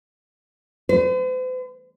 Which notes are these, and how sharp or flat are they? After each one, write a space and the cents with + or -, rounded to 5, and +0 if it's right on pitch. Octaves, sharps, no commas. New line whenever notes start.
C5 -45